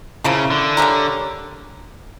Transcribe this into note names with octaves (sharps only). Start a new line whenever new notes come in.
C#3 F3 A#3 E4
D3
G3 C#4 G4 A#4